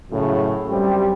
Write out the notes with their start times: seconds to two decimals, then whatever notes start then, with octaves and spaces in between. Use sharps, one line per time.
0.11 F#2 A2 C#3
0.68 F#2 G3 C4 G4